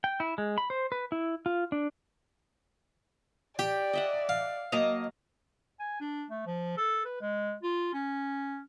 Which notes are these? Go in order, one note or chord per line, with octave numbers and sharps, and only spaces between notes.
G5
E4
G#3
B5
C5
B4
E4
F4
D4
G4 D5 G5
D#5 E5 F#5
F5
F#3 A#3 D#5 A5 A#5
G#5
D4
A3
F3
A4
B4
G#3
F4
C#4